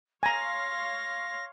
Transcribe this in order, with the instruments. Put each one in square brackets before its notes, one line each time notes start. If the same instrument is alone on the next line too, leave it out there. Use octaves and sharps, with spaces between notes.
[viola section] C#5 F5 C6 [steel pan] G#5 A#5 [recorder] A#6